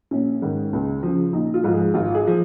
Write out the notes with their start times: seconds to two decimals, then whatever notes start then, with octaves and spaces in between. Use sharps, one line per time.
0.11 A#1 C#4
0.42 G#2 D#3
0.73 C#2
1.03 C#3 F3
1.33 A#1 D#4
1.54 F4
1.64 G#2 F3
1.73 G#4
1.94 G#1 F4
2.14 G#4
2.27 F3